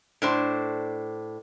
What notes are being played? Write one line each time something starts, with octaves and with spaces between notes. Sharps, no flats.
A2 D4 C5